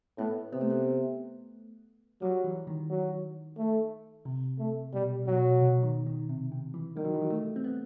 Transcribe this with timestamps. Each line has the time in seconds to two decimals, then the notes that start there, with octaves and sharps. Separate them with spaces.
0.18 A2 B3
0.53 C3 B3
0.61 A3
0.70 B3
2.22 F#3 G3
2.44 E3
2.67 D#3
2.90 F#3
3.58 A3
4.25 C3
4.59 A3
4.93 B2 G3
5.27 B2 F#3
5.61 B2
5.83 D#3
6.06 D#3
6.29 C3
6.52 C3
6.74 E3
6.96 D#3 G3
7.05 F#3
7.14 E3
7.22 F#3
7.30 A3
7.56 C4
7.64 B3